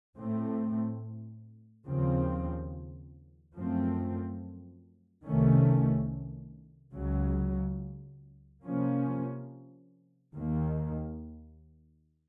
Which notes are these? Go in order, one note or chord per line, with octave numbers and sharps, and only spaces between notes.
A2 A3 C4
D#2 C#3 F3 C4
F#2 F3 A3 C4
C2 C3 D#3 A3 C#4
C#2 C#3 F#3
C3 F3 A#3 C#4
D#2 D#3 A#3